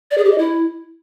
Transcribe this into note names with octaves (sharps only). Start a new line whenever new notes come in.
D5
G#4
G4
D#5
E4